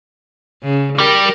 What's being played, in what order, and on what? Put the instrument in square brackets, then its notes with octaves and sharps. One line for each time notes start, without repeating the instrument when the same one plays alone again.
[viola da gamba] C#3
[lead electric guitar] G3 G4 [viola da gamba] A#4